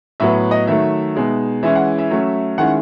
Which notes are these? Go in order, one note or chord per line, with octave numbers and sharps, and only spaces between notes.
A2 F#3 B3 E5
D#5
D#3 F#3 A3 E5
B2 G#3 D#4
E3 G#3 C#4 E4 E5
F#5
E5
F#3 A3 C#4
D#3 G#3 C#4 E4 F#5